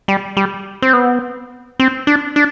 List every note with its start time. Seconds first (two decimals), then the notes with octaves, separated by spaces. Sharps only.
0.08 G3
0.37 G3
0.82 C4
0.93 B3
1.79 C4
2.07 D4
2.36 D4